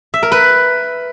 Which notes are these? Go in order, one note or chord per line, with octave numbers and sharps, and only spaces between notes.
E5
A#4
B4